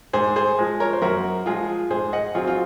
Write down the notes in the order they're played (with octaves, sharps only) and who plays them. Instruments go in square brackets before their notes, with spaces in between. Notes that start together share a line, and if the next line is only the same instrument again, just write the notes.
[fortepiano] G#2 G#4 C5
G#4 C5
F3 G#3
A#4 C#5
C5
F#2 F#4 A#4
F3 G#3 F4 G#4
G#2 G#4 C5
D#5 F#5
F#3 C4 F4 G#4
F4